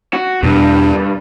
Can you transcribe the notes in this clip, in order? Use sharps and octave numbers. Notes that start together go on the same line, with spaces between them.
F#4
E2 G2 B2 D4